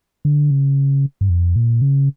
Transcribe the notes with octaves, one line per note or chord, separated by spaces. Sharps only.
D3
C#3
G2
F2
A#2
C#3